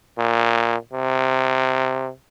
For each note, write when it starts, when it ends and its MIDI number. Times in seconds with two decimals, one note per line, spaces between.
0.18 0.76 46
0.93 2.11 48